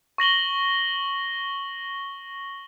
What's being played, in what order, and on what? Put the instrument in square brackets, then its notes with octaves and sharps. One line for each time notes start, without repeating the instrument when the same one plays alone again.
[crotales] C#6 A#6 F#7 G7